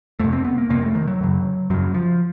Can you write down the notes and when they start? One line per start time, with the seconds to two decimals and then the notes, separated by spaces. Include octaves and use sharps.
0.20 F2 C3 A3
0.33 C4
0.44 B3
0.58 A#3
0.69 F2 C3 A#3
0.82 A3
0.95 D#3
1.08 F#3
1.20 F#2 C#3
1.70 F#2 C#3 F#3
1.94 F3